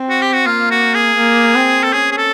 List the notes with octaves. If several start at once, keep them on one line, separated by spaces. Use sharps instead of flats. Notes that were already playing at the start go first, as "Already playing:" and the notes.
Already playing: C4
F#4
G4
F#4
A#3 F4
F#4
G#4
A#3
C4
A4
C#4 G#4
G#4
A4